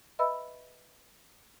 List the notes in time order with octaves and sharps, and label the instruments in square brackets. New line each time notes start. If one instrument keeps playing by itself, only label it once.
[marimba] B4 D#5 E5 B5 E6